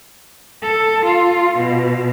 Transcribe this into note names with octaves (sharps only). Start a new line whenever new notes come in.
A4
F4
B2